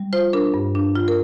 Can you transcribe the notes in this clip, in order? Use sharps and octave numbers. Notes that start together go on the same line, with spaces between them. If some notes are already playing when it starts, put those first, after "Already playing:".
Already playing: G3
F4 C5
D4 A#4
G2
D4
F4
A#4